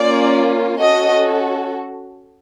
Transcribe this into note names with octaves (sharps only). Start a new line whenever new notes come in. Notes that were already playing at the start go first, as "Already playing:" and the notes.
Already playing: A#3 C#4 F4 D5
C#4 F#4 A4 D#5